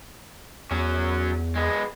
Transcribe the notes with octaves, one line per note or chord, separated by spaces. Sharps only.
E2 F#3 C#4
G#3 B3